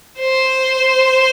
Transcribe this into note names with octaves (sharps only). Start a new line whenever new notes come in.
C5